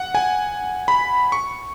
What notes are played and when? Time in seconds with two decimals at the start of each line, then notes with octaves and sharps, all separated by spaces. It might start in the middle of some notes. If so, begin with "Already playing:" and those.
Already playing: F#5
0.15 G#5
0.88 B5
1.32 C#6